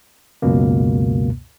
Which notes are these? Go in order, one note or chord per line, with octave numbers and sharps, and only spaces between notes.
C#2 F#2 B2 A#3